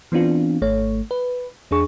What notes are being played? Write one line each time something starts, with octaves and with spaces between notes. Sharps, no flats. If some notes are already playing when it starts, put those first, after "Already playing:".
E3 B3 C4 D4 F4
G#1 A3 C#5
B4
E2 D4 G#4 C#6